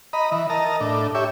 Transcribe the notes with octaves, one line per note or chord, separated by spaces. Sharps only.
D#5 A#5 B5
E3
A#4 D#5 A5 A#5
A2 D4
G4 C#5 E5